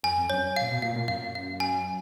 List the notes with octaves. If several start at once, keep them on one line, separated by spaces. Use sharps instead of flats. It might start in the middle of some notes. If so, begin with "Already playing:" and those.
F2 G#5
F2
F#2 C#5
A#2 F5
B2
A#2 F5
A#2
F#2 F5
F5
G#5